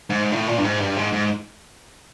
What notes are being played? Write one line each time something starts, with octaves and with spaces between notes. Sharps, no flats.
G#2
A2
A#2
G2
G#2
G2
G#2
G#2